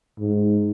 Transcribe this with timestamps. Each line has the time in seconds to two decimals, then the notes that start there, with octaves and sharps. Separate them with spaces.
0.19 G#2